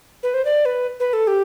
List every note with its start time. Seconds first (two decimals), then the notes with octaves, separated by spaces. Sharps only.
0.23 B4
0.34 C5
0.45 D5
0.65 B4
1.00 B4
1.13 A4
1.27 G4